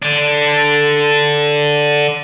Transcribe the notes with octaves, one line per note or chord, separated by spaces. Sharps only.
D3 D4